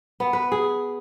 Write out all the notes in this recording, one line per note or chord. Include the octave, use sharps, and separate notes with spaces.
B3
B4
G#4